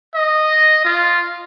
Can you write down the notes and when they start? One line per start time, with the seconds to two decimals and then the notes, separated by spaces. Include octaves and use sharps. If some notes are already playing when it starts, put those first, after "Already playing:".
0.15 D#5
0.85 F4